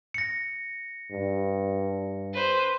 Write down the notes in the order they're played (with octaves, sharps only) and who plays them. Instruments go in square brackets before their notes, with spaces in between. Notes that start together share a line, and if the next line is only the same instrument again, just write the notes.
[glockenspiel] A#6 C#7
[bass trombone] G2
[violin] B4 C5